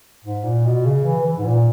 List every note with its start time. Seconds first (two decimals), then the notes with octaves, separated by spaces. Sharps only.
0.25 G#2
0.44 A#2
0.65 B2
0.84 C#3
1.05 E3
1.25 E3
1.38 G#2
1.46 A#2